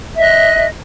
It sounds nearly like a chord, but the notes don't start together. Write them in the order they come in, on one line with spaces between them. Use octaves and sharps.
E5 D#5 F#6